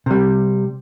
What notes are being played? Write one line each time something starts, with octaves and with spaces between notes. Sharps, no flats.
C3 G3